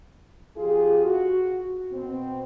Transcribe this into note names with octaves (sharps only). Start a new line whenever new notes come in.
F2 F4 G4 G#4
F#4
B2 C4